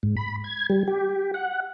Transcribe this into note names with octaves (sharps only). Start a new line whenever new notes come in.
G#2
B5
G#6
G3
G4
F#5